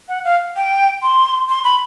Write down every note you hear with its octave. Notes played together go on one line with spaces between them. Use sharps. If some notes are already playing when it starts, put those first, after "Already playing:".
F#5
F5
G5
C6
C6
B5